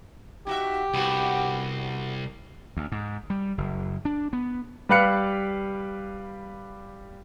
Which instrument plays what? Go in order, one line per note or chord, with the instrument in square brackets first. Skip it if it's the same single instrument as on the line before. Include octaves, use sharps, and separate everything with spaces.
[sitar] D#4 F#4 E5 [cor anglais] G4
[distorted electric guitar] C2 [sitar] G2 B3 F#4
[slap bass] D2
G#2
G3
F#1
D4
B3
[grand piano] G3 G4 B4 F5 F#6 C#7